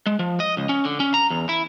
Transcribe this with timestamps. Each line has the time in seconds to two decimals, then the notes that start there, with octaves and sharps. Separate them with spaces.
0.06 G#3
0.19 F3
0.40 D#5
0.57 C#2
0.69 C#4
0.85 D3
1.00 C#4
1.14 A#5
1.30 E2
1.49 E4